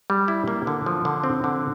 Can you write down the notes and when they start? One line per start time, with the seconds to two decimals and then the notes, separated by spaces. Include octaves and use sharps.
0.10 G3
0.28 E4
0.48 A#3
0.67 D3
0.86 F3
1.05 D3
1.24 C4
1.44 D3